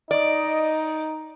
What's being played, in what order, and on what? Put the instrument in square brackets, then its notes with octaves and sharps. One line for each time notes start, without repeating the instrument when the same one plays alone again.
[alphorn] D#4 [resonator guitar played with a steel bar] D5 [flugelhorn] D#5